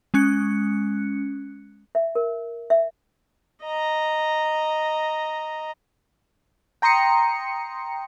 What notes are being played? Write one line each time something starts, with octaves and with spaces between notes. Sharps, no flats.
G#3 C#4 F#6 C#7
E5
A#4
E5
D#5 A#5
G5 A#5 C6 D#6 C#7